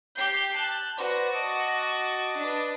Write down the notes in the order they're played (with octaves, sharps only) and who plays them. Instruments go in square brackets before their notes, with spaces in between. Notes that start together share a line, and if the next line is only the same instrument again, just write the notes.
[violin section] G4 G6 C7
[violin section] A5 [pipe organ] F#6 G6
[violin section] F#4 A#6 [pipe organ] B4 C5 D5
[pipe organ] D#5 A5 D6
[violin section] D4 B4